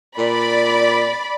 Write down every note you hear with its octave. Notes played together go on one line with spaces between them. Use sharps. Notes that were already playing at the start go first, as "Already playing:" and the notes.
A#2 D5 B5